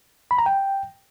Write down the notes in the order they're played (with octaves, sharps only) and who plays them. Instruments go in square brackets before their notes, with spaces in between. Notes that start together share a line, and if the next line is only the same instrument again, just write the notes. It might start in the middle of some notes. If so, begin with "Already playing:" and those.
[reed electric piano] B5
A#5
G5